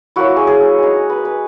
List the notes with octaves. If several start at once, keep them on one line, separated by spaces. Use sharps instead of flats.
F#3 A#3 E4 F#4
G#4
G#4
G#3 D#4
B4
B4